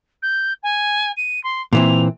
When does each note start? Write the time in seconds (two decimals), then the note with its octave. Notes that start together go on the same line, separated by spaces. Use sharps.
0.22 G6
0.63 G#5
1.17 D#7
1.43 C6
1.73 A#2 E3 C4 F7